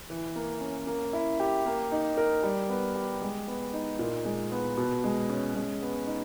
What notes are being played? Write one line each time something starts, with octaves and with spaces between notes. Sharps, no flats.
E3
A#3
C#4
A#3
E4
G4
A#3
D#4
A#4
G3
B3
G4
G#3
B3
D#4
A#2
G#3
B3
B2
G#3
C#4
G#3
B3
D#4